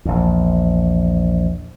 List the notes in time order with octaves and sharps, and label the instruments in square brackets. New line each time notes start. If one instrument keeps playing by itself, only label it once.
[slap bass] A#1 E2